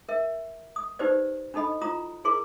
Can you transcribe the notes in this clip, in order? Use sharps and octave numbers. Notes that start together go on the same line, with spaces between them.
A#4 E5
D#6
D#4 G4 B4 C5 D5
D4 D#4 A4 D#5 B5
E4 F4 A#5 D#6
E4 G#4 A#4 C6 D6